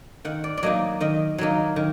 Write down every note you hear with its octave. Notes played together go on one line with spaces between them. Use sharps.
D#3 F#5
D5
D5
F#3 A#3 D#4 D#5
D#3 D#5
F#3 A#3 D#4
D#3